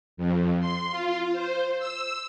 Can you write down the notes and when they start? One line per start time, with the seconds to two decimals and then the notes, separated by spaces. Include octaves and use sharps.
0.17 F2
0.61 C6
0.92 F4
1.33 C5
1.79 E6